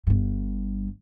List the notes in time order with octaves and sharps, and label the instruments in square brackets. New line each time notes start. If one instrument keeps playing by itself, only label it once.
[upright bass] G1 G2